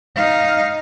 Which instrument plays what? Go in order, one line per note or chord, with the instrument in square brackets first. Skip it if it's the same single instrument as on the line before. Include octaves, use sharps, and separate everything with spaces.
[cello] D#4 F5